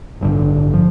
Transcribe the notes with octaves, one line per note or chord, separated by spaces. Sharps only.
A1 G2 D3
F3